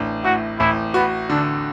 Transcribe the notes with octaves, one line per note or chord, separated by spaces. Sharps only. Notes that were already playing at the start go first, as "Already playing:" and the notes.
Already playing: A1 D4
A2 F#4
A1 E4
B3 F#4
D3 D4